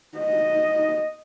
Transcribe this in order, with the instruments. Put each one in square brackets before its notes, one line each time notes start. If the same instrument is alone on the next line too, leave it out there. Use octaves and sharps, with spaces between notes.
[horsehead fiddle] D#5